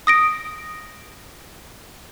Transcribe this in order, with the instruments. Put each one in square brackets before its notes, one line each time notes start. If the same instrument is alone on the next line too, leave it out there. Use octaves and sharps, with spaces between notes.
[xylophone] D#6 A#6 D7